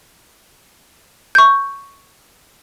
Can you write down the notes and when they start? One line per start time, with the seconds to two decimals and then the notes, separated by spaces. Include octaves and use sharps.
1.35 C#6 G6